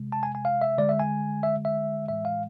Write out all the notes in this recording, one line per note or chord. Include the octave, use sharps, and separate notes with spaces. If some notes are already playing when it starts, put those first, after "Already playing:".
Already playing: C3 G#3
A5
G#5
G#5
F5
E5
D3 G#3 D5
E5
G#5
E5
E5
A2 E3 G#3 E5
F5